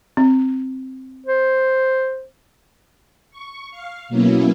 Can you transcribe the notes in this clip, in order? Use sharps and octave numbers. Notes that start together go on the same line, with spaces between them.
C4
C5
C#6
F5
B2 F#3 A#3 B3 C#4 E4